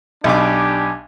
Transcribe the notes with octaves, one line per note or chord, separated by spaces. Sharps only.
B1 B2 D4 G4 G#5 D6